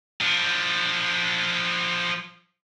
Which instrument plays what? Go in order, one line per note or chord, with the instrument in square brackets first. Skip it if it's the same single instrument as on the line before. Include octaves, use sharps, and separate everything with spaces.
[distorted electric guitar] F3 D4